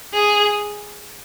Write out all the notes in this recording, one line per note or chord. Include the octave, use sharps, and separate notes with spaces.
G#4